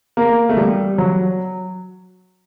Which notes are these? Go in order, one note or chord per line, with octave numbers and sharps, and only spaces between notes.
A#3
A3
G3
F#3